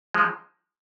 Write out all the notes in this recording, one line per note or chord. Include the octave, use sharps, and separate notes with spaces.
F3 G#3